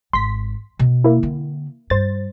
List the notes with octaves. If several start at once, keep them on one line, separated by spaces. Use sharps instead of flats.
G#1 C6 B6
B2
A#3 E4
D3 C4
G2 C5 A6